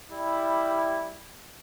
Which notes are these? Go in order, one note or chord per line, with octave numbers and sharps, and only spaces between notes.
G3 E4